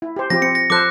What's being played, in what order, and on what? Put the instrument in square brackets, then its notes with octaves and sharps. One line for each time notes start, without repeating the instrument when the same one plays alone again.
[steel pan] E4
G4 C5
[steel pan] F3 C4 G4 [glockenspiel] A#6
[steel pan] C4 [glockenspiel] C#7
[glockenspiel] A#6
[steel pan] F3 A4 C5 [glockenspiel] D6 F#6